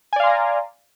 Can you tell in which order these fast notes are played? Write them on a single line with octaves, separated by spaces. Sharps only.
G#5 D5 F5 C6 A#5